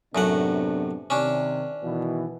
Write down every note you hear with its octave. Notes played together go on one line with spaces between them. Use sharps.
F#2 A2 C3 B3 D4 F#5
C3 D#3 C#4 D4
B2 D#3 E3